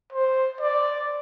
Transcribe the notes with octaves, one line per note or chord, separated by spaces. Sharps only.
C5
D5